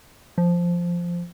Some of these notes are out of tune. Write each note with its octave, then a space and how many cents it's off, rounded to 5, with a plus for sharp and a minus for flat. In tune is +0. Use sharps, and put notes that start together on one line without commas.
F3 -5